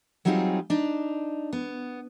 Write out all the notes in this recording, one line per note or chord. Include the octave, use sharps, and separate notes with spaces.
F#3 G3 C4 D#4 F4 G#4
D4 D#4
B3